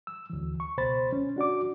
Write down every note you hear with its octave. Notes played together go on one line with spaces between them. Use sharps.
E6
D2 E3
C#6
C#2 B2 C5 B5 A6
C#4
D4 F#4 D5 D6